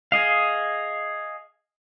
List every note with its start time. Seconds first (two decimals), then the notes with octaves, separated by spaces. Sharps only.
0.12 G#4 D#5 F5